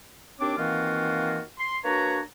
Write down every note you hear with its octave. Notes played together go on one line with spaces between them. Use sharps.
D#2 C4 D4 C#5 D6
D#3 E3 A#3 C4 F4 F#4
C6
A#3 D4 F#4 B4 C#5 A#5